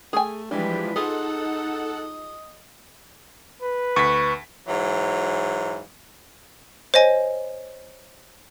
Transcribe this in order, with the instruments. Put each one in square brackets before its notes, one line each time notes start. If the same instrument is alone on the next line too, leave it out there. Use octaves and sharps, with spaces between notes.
[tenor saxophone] A3 [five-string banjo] G#4 G#5
[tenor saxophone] E3 [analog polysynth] F3 G#3 D4 [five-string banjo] G3 [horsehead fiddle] G4 B4
[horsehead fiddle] D#4 [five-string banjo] F4 G#4 [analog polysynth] A4 F#5 [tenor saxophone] D#5
[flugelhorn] B4
[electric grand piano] D2 B6 [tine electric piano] C#6
[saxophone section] G#2 E3 F#3
[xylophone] C5 C#5 D#5 G#5